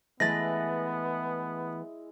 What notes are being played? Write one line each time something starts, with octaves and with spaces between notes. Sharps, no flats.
E3 G#3 A3 B3 E4 B4 A6 A#6